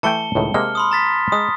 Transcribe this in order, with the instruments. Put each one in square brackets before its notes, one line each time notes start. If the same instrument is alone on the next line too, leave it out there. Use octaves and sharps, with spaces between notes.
[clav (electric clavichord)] E3 A3 G5 [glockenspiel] A5 C#7 G7
[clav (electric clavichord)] C#2 A2 D#3
[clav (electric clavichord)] C3 G#3 A#3 [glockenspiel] F6
[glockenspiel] B5 C6 D#6
A#5 A6 B6
[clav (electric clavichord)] G#3 [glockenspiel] D#6